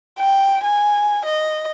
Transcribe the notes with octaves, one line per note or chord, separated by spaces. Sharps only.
G5
G#5
D#5